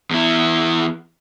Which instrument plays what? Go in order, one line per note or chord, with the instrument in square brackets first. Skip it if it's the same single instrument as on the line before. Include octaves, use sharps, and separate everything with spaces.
[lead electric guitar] E2 E4